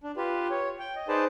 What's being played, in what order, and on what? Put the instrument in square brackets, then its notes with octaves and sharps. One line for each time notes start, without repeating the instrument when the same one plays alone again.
[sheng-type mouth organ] D4
F4 G4 B4
C#5
G5
D#5
D#4 G#4 B4 C5 D5 A5